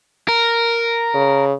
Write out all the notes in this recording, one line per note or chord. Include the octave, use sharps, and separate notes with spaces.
A#4
C#3